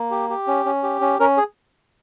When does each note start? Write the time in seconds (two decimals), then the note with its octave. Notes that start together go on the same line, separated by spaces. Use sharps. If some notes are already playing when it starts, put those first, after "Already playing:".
Already playing: A#3
0.11 G4
0.30 G4
0.47 C#4
0.65 C#4
0.83 G4
1.01 C#4
1.20 C#4 A#4
1.37 G#4